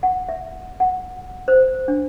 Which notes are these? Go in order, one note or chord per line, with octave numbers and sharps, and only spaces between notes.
F#5
E5
F#5
C5
D4